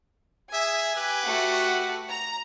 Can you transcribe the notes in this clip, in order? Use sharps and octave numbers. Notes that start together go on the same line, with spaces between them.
G#4 E5 G#5
G4 B4
A3 F#4 F#5
A#5